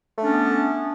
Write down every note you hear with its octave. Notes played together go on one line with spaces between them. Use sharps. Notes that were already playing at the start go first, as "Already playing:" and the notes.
A3 B3 C#4 D4